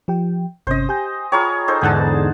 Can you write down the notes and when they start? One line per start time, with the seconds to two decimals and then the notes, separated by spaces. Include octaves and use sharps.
0.08 F3 G4 G5
0.67 G1 C3 C#4 C5 D#5
0.89 G4 G#5 G6
1.32 F4 G#4 C#5 G5 A#5 B5
1.68 D#4 A4 C5
1.81 E2 G#2 D3 G#4 F#5 A5